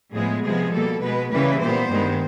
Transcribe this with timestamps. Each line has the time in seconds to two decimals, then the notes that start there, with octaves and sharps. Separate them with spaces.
0.15 A2 F3 G#3 B3 G#4
0.44 C3 F3 G#3 B3 G#4
0.73 B2 G3 A#3 A4
1.02 B2 G#3 B3 B4
1.31 C#3 E3 G3 A#3 B4
1.61 A#2 G3 B3 C5
1.90 G2 D#3 G#3 B3